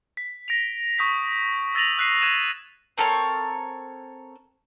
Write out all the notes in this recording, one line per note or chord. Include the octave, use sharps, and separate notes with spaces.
B6
A#6 D7 F7
C#6 D#6 G6 B6
E6 A6 A#6 D#7 F7 F#7
E6 F#6 B6 C7 D#7
D#6 F#6 G#6 D#7 E7
C4 A4 A#4 C#5